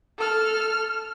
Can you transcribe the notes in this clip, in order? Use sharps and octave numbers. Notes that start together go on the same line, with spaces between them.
A4 F6